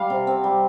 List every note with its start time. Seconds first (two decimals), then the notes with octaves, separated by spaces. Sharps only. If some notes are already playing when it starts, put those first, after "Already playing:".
Already playing: G3 F5
0.10 C3
0.27 C4
0.44 G3